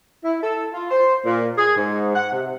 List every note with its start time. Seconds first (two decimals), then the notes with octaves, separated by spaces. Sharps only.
0.24 E4
0.43 A4
0.74 F4
0.91 C5
1.25 A#2
1.58 G#4
1.76 G#2
2.16 F#5
2.32 C3